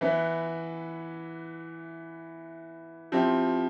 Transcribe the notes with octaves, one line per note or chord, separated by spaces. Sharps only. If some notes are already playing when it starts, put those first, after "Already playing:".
E3 B3 E4 B4
F3 C4 E4 G4